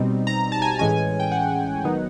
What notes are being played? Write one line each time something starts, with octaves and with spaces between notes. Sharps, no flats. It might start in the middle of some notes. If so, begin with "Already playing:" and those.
Already playing: B2 G3 C4 D#4
A#5
A5
G#5
A2 E3 G#3 C#4 G#5
G5
F#5
D#3 F#3 B3 D#4